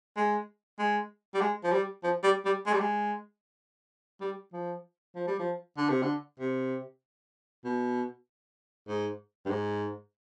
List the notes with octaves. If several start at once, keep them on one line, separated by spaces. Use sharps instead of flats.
G#3
G#3
G3
G#3
F3
G3
F3
G3
G3
G#3
G3
G#3
G3
F3
F3
G3
F3
D3
C3
D3
C3
B2
G#2
G2
G#2